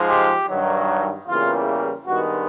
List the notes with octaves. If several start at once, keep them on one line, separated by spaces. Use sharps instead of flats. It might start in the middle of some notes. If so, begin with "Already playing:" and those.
Already playing: G#2 F3 G#3
G4
G2 D#3 F#3
E2 C#3 E3 G3 A#3 F4
G2 D#3 G#3 B3 F#4